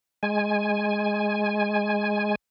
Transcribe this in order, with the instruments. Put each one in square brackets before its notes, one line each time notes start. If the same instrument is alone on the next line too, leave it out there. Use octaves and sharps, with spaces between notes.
[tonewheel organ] G#3 G#5